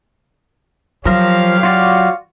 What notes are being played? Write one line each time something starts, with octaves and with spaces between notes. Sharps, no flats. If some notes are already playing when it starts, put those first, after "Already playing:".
F3 F#3 G4 A#4 C#5 F5
F4 F#4 D5